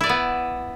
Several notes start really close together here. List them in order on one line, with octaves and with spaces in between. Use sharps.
E4 D5 B4 B3